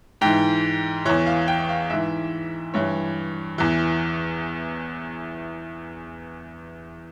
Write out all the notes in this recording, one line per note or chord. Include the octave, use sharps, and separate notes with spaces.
G#2 E3 G5
E2 E3 C#5
F5
G5
F5
G#2 E3 E5
G2 E3 C#5
E2 E3